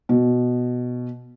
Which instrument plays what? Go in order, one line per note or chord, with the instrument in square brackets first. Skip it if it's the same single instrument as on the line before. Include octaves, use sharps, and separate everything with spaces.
[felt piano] B2